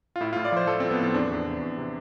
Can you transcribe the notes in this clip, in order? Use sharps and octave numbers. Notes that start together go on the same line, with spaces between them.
F4
A2 E4
F4
A2
D5
F3 C5
F3 A4
C4
F3
B3
A2 C4
E2 D4
E2
C3
E2
C3